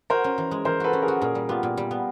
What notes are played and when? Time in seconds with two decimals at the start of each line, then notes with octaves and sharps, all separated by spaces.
0.10 F#4 A#4 C5
0.24 C#4
0.38 E3
0.51 G#3
0.65 E3 A#4 C5
0.80 F#4 A4 B4
0.93 C#4
1.02 G#4 A#4
1.08 F#4
1.21 A#2 G#4 A#4
1.35 G3
1.49 B3 F4 G4
1.63 A#2
1.77 G3
1.91 B3